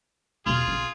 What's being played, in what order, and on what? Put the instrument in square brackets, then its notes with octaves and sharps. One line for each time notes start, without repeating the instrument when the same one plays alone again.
[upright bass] E2 B2 [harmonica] F4 G#4
[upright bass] B1 C4